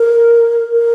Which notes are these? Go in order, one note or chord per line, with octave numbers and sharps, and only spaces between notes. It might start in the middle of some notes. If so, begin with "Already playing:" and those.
Already playing: A#4
A#4